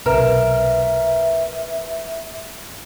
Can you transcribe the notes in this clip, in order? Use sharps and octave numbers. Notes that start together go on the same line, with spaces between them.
B1 C3 A#4 B4 E5